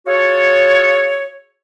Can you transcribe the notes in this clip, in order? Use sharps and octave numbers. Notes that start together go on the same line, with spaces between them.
F4 F#4 G#4 A4 C#5